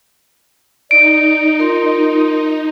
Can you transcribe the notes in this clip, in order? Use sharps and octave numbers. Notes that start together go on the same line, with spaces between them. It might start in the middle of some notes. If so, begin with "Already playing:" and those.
D#4 D5 D7
F4 A#4 C6